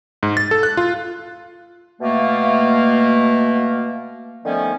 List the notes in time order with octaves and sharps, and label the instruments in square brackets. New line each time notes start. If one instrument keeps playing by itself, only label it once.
[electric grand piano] G#2
A6
A4
F#6
F4
[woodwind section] B2 A3 A#3
D3 D#3 F3 A3 B3 C#4